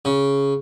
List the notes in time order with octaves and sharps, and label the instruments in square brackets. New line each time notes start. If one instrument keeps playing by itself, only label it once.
[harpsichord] C#3